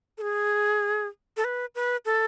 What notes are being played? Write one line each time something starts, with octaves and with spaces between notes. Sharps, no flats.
A4
G#4
A4
B4
B4
A4